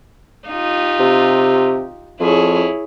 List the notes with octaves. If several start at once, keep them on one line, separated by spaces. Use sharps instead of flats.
D#4 F4 G4
C3
F2 E4 G#4 C#5